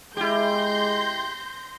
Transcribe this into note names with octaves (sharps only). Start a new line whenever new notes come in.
G#3 E4 G4 C6 G6 A#6